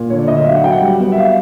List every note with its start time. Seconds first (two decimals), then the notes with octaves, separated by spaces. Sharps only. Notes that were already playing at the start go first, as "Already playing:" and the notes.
Already playing: A#2
0.10 D3 C#5
0.18 D5
0.28 D2 D#5
0.36 E5
0.46 F#3 F5
0.55 F#5
0.64 F#3 G5
0.72 F#5
0.81 G3
1.00 B3
1.12 E5
1.18 F5